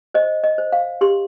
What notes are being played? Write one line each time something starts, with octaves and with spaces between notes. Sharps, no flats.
C5 D#5
D#5
C5
F5
G4 C6